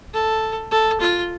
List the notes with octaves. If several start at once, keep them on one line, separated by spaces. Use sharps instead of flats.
A4
A4
F4